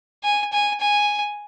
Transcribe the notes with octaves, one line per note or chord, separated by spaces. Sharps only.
G#5
G#5
G#5